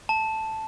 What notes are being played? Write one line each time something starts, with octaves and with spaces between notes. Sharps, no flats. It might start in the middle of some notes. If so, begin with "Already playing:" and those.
A5